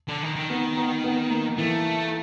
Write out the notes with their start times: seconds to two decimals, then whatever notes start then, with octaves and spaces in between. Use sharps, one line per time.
0.09 D3
0.23 D#3
0.36 D#3
0.50 B3
0.77 B3
1.04 B3
1.30 A#3
1.58 E3 A3